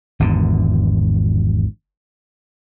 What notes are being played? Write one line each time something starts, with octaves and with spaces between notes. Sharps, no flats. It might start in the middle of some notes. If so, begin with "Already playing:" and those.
G#1 E2 D3